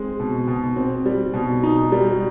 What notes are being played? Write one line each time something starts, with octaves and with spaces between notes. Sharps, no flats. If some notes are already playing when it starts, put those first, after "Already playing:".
Already playing: G#3 C4
B2
B2
C4
G3
B2
D#4
G3